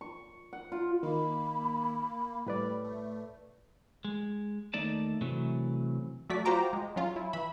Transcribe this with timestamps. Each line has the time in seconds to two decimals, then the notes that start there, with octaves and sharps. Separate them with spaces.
0.01 C#6
0.53 F#5
0.72 F4
1.03 D#3 A#3 B5
2.46 A2 G3 B4 D5
2.84 A3
4.05 G#3
4.74 D#2 A3 D#4 D5 A5
5.21 C3 E3 F#3 A3
6.30 F#3 A3 F#4 D5 B6
6.45 F4 F#4 C5 G5 A#5 D6
6.73 G#3
6.96 F#3 C#4 F4
7.16 E4
7.33 E3 E5 B5